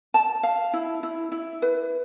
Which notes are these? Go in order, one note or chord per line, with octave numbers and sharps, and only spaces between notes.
A5
F5
E4
E4
E4
B4